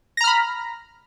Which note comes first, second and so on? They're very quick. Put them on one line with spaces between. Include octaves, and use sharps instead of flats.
A#6 A#5 F6 B5